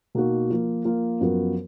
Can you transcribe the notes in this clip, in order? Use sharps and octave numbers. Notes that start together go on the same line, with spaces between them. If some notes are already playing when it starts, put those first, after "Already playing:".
B2 A#3 D#4 F#4
F3 A#3 F4
F3 A#3 F4
F#2 F3 B3 F#4 A#4